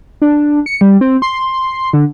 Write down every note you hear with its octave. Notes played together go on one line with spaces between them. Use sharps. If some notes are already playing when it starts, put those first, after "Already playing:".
D4
C#7
G3
C4
C6
D3